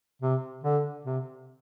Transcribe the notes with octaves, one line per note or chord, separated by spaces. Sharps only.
C3
D3
C3